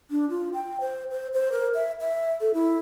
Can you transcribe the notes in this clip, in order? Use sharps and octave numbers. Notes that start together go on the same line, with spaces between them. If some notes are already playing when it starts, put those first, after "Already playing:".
D4
F4
G5
C5
C5
C5
A#4
E5
E5
A4
E4